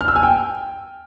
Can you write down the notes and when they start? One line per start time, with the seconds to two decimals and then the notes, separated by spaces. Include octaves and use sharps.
0.01 F6
0.08 E6
0.16 G#5
0.23 G5